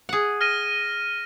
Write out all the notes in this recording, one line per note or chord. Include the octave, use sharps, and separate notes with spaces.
G#4 F#5
F6 A#6 D#7